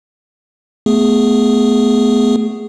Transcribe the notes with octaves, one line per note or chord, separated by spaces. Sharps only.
A3 B3 G#4